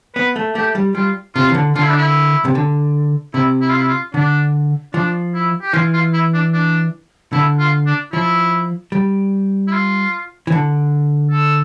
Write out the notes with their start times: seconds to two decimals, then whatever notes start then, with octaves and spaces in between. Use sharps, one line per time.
0.15 B3 B4
0.36 A3
0.55 A3 G4
0.75 G3
0.95 G3 F4
1.35 C3 F4
1.49 E3
1.54 D3
1.75 D3 F4
1.82 E4
1.90 D4
1.97 E4
2.45 C3
2.55 D3
3.34 C3 E4
3.61 E4
3.69 F4
3.78 E4
3.88 F4
4.14 D3 D4
4.94 F3 D4
5.34 E4
5.62 G4
5.73 E3 F4
5.93 F4
6.13 E4
6.34 D4
6.53 D4
7.33 D3 E4
7.59 F4
7.86 D4
8.13 F3 E4
8.92 G3
9.67 E4
9.72 F4
10.47 E3
10.52 D3
11.31 A4